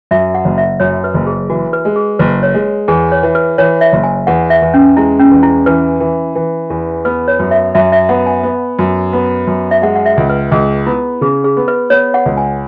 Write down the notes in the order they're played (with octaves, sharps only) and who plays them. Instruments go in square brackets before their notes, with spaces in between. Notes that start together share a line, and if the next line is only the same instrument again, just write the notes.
[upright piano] F#2 [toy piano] E5
[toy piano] F#5
[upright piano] F#1
[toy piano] E5
[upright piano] F#2 [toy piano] C#5
[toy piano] B4
[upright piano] F#1
[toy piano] G#4
[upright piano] E3 [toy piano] F#4
[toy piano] B4
[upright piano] G#3
[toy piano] G#4
[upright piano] F#1 [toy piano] B4
[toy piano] C#5
[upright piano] G#3
[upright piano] E2 [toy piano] G#4
[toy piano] C#5
[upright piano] E3
[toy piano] B4
[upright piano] E3 [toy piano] C#5
[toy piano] E5
[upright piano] F#1
[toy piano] G#5
[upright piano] E2 [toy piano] F#5
[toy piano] E5
[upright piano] E2
[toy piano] C#4
[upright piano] G#3 [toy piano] E4
[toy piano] C#4
[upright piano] E2
[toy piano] E4
[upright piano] E3 [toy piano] B4
[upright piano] E3
E3
E2
[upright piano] B3 [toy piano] B4
[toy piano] C#5
[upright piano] F#2
[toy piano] E5
[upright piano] F#2 [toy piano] E5
[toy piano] E5
[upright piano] B3 [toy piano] F#5
[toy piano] G#5
[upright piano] B3
F#2
B3
F#2
[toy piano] E5
[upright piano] G#3 [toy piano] F#5
[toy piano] F#5
E5
[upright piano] C#2
[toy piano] B4
[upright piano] C#2 [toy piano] G#4
[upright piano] B3 [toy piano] E4
[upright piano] C#3 [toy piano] G#4
[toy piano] G#4
[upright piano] B3
[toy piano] B4
[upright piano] B3 [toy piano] C#5
[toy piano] F#5
[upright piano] C#2
[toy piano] G#5